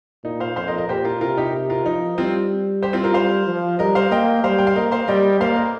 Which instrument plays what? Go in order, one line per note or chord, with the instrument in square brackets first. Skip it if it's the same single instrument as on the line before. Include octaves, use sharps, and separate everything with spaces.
[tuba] A#2 [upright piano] D#4
[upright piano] C5 F5
[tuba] F2 [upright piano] C5 F5
[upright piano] A#4 D#5
A#4 D#5
[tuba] A#2 [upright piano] G4 C5
[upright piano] F4 A#4
[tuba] C3 [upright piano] F4 A#4
[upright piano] D#4 G4
F4 A#4
[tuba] F3 [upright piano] D#4
[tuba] G3 [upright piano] C4 F4
[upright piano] G4 C5
C4 F4
F4 A#4
[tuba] G3 [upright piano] C5 F5
[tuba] F3
[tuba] G3 [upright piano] A#4 D#5
[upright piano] C5 F5
[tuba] A#3 [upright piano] D#5 G5
[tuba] G3 [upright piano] C5 F5
[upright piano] G5
F5
[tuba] A#3 [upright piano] A#4 D#5
[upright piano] C5 F5
[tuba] G3 [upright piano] D#5 G5
[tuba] A#3 [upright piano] C5 F5
[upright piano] A#4 D#5